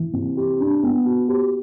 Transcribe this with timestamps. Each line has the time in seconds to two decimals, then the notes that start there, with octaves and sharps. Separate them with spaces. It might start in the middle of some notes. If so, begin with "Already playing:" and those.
Already playing: E3
0.13 C3
0.37 G4
0.60 D4
0.83 B3
1.05 F#4
1.28 G4